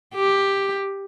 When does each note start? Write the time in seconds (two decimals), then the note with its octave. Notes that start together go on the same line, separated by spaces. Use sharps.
0.15 G4